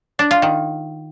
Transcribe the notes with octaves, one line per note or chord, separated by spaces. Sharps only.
D4
F4
D#3